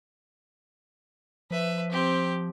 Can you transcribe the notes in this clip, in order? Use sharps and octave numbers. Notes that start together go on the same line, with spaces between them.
F3 B4 E5
C4 G4